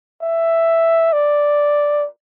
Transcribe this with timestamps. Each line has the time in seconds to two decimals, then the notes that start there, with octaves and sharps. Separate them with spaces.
0.22 E5
1.13 D5